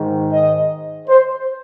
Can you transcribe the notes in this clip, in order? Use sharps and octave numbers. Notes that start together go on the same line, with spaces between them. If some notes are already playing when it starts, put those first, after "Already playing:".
Already playing: G#2 D#3
D#5
C5